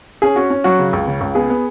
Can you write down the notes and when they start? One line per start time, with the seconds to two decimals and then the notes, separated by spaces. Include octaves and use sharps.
0.22 C#4 G#4
0.36 C#4 F#4
0.51 C#4
0.64 F#3 F#4
0.79 C#3
0.93 C#2
1.07 C#3
1.21 C#2
1.35 B3 G#4
1.50 B3